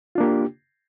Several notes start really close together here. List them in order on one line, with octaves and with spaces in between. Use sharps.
F4 D4 A#3 G4